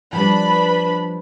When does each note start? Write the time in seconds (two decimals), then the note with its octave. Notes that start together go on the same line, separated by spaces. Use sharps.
0.13 F3 G3 D4 B4 B5